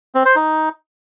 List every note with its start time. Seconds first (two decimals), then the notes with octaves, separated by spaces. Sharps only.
0.15 C4
0.25 C5
0.36 D#4